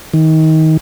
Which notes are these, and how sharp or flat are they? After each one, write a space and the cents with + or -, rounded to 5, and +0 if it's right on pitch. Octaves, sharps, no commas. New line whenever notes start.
D#3 +25